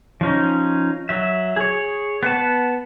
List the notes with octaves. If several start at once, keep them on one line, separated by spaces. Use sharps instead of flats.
F3 C#4 D#4
F#3 E5
G#4 C#5
B3 F#5 A5